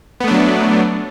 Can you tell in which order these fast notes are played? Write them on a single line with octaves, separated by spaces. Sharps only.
B3 A3 D4 F#3